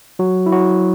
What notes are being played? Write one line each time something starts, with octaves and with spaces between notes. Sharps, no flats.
F#3 F#4
E4
F#3 F#4